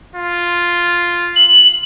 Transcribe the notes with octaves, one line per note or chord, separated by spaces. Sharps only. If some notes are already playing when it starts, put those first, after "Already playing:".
F4
F#7